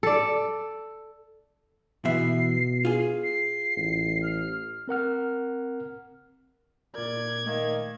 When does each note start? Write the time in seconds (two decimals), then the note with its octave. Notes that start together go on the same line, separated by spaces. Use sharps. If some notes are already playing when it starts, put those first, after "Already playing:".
0.03 A4 D5
2.05 B2 E3 B3 E5 C7
2.85 F4 G#4
3.24 C7
3.77 A1
4.23 F6
4.88 C4 A#4 F#5 F6
6.95 A#2 A#4 D5 G#6
7.46 D#3 A3 D#5 F5